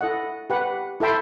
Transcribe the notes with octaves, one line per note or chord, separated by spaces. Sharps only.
E4 A4 D#5 F#5
G4 B4 F#5
E4 A4 E5 G5 C6